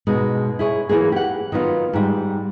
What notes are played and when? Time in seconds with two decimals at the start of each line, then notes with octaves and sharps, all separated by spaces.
0.07 G#2 B2 G#3
0.59 E4 G#4 C#5
0.89 E3 F#3 A#3 G#4
1.12 G4 F#5
1.52 D#3 F#3 B3 F4
1.93 G#2 G3